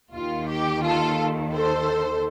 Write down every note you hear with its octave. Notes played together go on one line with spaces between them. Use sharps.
D#2 D#3 F4
G4
F4 A4
A4 C5